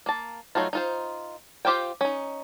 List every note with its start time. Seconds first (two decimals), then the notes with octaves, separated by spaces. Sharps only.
0.06 A#3 A5
0.55 F#3 A3 D#4 F4
0.73 D#4 F4 C5
1.65 F4 G4 C5 F5 G5
2.01 C#4 D#4